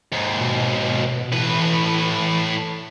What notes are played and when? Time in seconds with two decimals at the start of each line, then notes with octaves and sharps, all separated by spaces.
0.12 D#2 G#2
0.41 B2
1.33 A2 E3 B4